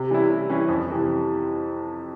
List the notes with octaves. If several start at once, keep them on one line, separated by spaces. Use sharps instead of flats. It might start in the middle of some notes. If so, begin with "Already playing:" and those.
Already playing: C3
E3 G3 C#4 E4
C3
E3 G3 C#4 E4
F2
C3 E3